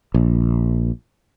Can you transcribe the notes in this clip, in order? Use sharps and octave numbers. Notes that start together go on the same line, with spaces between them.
A#1